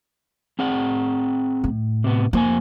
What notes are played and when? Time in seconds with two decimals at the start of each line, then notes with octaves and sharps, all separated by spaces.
0.59 C4 G#4 F#5
1.64 A2
2.04 C3 B3
2.33 F2 A#3 C5 G#5